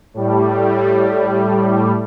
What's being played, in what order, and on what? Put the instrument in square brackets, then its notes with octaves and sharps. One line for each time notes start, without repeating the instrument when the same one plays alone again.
[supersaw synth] A2 G3